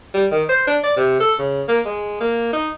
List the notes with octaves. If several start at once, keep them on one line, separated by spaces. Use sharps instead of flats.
G3
D#3
C5
D4
D5
C3
A4
C#3
A#3
G#3
A#3
D#4